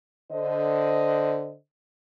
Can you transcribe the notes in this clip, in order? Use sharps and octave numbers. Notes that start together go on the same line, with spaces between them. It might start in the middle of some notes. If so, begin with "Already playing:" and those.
D3 C5 D#5